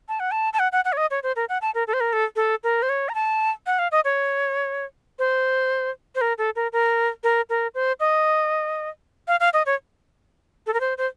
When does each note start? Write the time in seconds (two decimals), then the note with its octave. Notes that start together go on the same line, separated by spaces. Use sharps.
0.09 A5
0.20 F#5
0.31 A5
0.53 A5
0.59 F#5
0.72 F#5
0.85 F#5
0.93 C#5
0.97 D#5
1.11 C#5
1.23 C5
1.36 A#4
1.49 F#5
1.62 A5
1.75 A#4
1.87 A4
1.93 C5
2.00 A#4
2.13 A4
2.36 A4
2.64 A#4
2.83 C5
2.89 C#5
3.09 A#5
3.15 A5
3.66 F#5
3.79 F5
3.92 D#5
4.05 C#5
5.19 C5
6.15 C5
6.21 A#4
6.38 A4
6.56 A#4
6.73 A#4
7.24 A#4
7.50 A#4
7.75 C5
8.00 D#5
9.28 F5
9.40 F5
9.54 D#5
9.66 C#5
10.67 A4
10.74 A#4
10.80 C5
10.98 C5